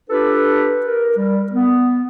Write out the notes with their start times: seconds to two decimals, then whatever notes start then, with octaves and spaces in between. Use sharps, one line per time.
0.10 D4 F4 G4 A4 B4
0.87 A#4
1.17 G3
1.52 B3